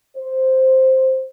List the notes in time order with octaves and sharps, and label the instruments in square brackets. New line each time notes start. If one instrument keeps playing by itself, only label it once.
[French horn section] C5